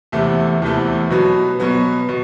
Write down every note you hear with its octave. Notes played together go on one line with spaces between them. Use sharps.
E2 C3 E3 A3
E2 C3 E3 A3
B2 F#3 B3
B2 F#3 B3
B2